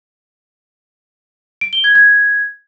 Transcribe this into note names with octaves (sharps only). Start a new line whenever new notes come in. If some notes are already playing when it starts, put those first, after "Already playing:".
D7
G7
G#6
G#6